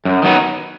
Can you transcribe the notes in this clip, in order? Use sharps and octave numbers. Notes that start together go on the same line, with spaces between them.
F#2
D#3 F#3 B3 D#4